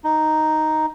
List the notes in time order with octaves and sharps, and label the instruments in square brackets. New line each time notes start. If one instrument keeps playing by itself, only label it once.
[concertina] D#4